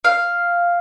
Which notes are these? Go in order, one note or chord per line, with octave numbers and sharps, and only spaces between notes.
F5